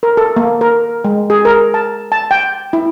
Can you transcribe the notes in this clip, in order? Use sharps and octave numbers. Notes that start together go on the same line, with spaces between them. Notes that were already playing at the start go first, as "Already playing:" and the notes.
A#4
A4
A#3
A#4
G#3
G#4
A#4
A5
A5
G5
E4